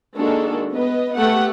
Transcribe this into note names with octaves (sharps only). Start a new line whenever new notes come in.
D#3 G#3 A#3 D4 F#4 A4
B3 B4 D#5
A3 B3 G4 F#5